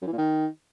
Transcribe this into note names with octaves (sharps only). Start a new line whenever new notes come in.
F#2
E3
A#2
D#3